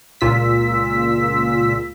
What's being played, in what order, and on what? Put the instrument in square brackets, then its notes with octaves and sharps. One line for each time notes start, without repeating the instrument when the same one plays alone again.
[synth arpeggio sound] C#2 A#2 F4 E6 B6